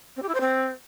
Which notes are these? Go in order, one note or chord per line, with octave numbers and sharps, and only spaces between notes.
C4
G4
E4
C5
C4